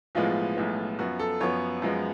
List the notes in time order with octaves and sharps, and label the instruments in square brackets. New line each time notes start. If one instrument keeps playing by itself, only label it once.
[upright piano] B1 A2 F3 G#3 B3 F4
B1 A2 F3 G#3 B3
F#2 F3 B3 F#4
A4
F#2 F3 B3 C#5
F#2 F3 G#3 B3